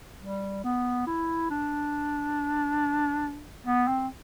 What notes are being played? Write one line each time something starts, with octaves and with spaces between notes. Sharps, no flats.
G3
B3
E4
D4
B3
C4